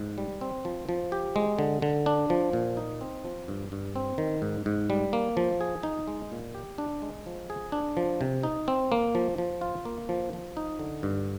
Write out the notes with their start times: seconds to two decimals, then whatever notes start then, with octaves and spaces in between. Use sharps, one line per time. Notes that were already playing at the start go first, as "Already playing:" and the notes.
Already playing: G#2
0.18 G3
0.41 C4
0.65 F3
0.89 F3
1.12 G4
1.36 G#3
1.59 D3
1.82 D3
2.06 D4
2.30 F3
2.53 A#2
2.77 D#4
3.01 C4
3.25 F3
3.48 G2
3.72 G2
3.96 C4
4.18 D#3
4.42 G#2
4.66 G#2
4.90 G3
5.13 A#3
5.37 F3
5.61 G#4
5.83 D#4
6.08 G#3
6.32 A#2
6.55 G4
6.78 D4
7.02 G#3
7.26 F3
7.50 G#4
7.72 D4
7.97 F3
8.21 C3
8.43 D#4
8.68 C4
8.92 A#3
9.15 F3
9.38 F3
9.61 F4
9.85 A#3
10.09 F3
10.33 F3
10.57 D#4
10.79 D3
11.03 G2